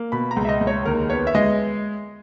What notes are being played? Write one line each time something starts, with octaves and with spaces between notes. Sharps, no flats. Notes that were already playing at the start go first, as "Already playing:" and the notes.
Already playing: A#3
B2 B5
A#5
C#2
E5
D#5
C#2
C#5
D#2 A#4
B3 C#5
E5
G#3 D#5